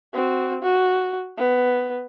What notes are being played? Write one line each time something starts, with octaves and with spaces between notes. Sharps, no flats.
C4 F#4
F#4
B3